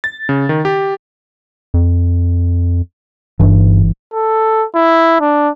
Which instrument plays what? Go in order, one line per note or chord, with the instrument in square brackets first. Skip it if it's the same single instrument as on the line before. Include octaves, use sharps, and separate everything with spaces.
[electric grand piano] A6
C#3
D#3
G4
[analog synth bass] F2
[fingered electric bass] G1 E3 [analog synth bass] G2
[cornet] A4
E4
D4